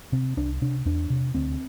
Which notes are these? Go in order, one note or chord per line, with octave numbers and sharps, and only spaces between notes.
C3 C4
C2 D4
C3 D4
E2 D4
C3
D2 C4